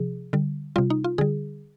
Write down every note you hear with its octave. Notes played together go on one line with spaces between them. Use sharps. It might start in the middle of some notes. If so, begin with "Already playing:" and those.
Already playing: C3 F3 G#4
D3 G3
C3 G3 F4
D#4
F4
D3 G3 G#4